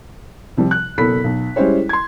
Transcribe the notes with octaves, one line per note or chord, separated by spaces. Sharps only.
C3 F3 G3
F#6
F#1 B2 A4 B5 B6
B1
G3 G#3 C#4 E4 C5 C#5
C6 G#6